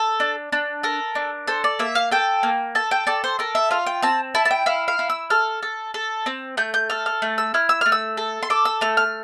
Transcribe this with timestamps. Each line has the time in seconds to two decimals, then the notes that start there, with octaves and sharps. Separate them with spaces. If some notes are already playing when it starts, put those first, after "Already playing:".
Already playing: A4
0.20 D4
0.52 D4
0.83 A4 A#4
1.15 D4
1.47 A4 C5
1.64 D5
1.79 A#3 E5
1.95 F5
2.11 A4 G5
2.43 A#3
2.75 A4 A5
2.91 G5
3.07 A4 D5
3.24 C5
3.39 A4 A#4
3.55 E5
3.71 F4 F5
3.86 G5
4.02 C4 A5
4.35 E4 A5
4.45 A5
4.51 G5
4.66 E4 F5
4.88 F5
4.99 E4
5.10 E6
5.30 A4 F6
5.63 A4
5.94 A4
6.26 C4
6.57 A3 G6
6.74 G6
6.90 A4 F6
7.06 F6
7.22 A3
7.38 E6
7.54 E4 F6
7.69 E6
7.81 A3 F6
7.92 E6
8.17 A4
8.43 C6
8.50 A4 D6
8.65 E6
8.81 A3 F6
8.97 F6